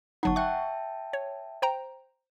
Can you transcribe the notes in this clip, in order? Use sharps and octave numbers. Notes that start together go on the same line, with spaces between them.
G1 F#3 D#4 F#5 A5 C#6
E5 G5 A5 C#6 F#6
C#5
C5 G5 A#5